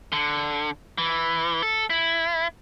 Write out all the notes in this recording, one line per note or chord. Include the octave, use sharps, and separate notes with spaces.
D3
E3
A4
E4